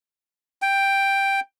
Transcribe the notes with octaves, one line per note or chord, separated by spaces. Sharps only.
G5